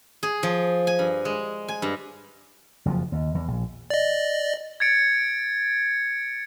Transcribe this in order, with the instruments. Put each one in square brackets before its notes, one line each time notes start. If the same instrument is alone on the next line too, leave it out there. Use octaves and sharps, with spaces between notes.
[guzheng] G#4
F3
G#5
G2
G#3
G#5
G2
[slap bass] F#1 F2 C#3 F3
D#2
E2
A#1
[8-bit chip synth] D5 D#5
[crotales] G#6 A6 C#7 D7